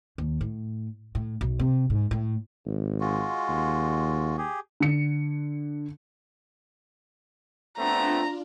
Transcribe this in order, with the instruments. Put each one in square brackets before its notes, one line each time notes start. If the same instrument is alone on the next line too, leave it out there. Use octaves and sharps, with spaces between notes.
[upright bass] D#2
A2
A2
B1
C3
G#2
A2
[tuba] G#1
[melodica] G#3 F4 F#4
[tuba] D#2
[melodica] G4 G#4
[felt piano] D3 C#7
[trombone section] A3 B3 C4 [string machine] D4 F4 [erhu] A#5